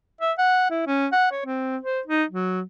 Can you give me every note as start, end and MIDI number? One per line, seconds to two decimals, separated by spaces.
0.21 0.32 76
0.38 0.68 78
0.70 0.86 64
0.87 1.07 61
1.12 1.30 78
1.31 1.41 73
1.46 1.78 60
1.83 2.01 72
2.07 2.24 63
2.30 2.62 54